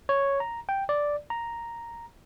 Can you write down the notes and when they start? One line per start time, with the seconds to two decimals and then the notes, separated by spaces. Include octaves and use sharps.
0.09 C#5
0.40 A#5
0.69 G5
0.89 D5
1.30 A#5